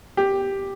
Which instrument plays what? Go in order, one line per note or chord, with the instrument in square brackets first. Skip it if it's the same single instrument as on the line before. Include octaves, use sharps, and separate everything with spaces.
[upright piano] G4